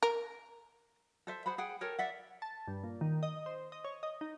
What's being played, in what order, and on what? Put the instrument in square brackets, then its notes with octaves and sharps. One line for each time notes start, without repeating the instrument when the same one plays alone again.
[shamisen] A#4
[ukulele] A4 C5 E5
G#4 C5 F#5 B5
G#4 F#5 G5
A4 A#4 C#5 G5
D5 E5 F#5
[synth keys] A5
G2
A#2
D#3
D#5
C5
D#5
C#5
D#5
D#4